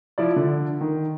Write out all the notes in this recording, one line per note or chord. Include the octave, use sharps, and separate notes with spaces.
F3 E4 D5
D3
D#3